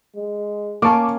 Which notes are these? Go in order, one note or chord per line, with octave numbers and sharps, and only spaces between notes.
G#3
A#3 C#4 A5 C#6 D6